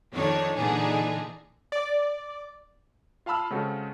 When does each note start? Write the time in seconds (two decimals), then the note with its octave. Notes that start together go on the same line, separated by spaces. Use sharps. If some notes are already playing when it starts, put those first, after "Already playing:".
0.13 F2 D#3 D4 D#4 C#5
0.56 A#2 D3 E3 D4 D#4 G#4
1.72 D5
3.26 F4 F5 A5 B5 E6 F6
3.51 C#3 G#3 C4 F#4 A4